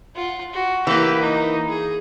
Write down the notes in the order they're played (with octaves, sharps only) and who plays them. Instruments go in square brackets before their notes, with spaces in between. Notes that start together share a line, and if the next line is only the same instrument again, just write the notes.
[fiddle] F4 F#5
F#4
[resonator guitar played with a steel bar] E3 A#3 [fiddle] G4 B4
[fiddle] D#4
G#4